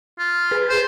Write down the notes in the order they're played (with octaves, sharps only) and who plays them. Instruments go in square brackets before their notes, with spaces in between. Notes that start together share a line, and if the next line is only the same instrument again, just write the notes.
[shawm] F4
[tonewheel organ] G#4 B4
[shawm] C5